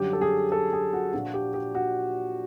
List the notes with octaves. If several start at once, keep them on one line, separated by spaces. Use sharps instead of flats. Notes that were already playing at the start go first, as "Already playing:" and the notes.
Already playing: F#2 D3 G3 G4
A4
G#4
A4
G#4
F#4
A#2 F3 A#3 D4 F4 F#4
G4
G4
F#4